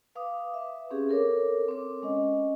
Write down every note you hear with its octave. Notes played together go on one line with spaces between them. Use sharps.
B4 F5 D6 D#6
B4 E5
C4 C#4 G4 G#4
A4 A#4 C#5 D6
C4 D6
G#3 C#4 D#5